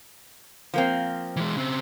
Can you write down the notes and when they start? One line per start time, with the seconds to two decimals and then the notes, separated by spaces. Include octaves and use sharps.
0.74 F3 A#3 C4
1.36 E3 G#3
1.56 C#3 C4